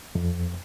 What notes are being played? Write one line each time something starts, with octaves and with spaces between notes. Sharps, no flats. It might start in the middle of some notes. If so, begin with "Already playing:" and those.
F2